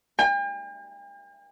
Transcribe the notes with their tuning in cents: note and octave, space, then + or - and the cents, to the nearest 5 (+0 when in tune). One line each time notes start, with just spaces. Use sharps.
G5 +45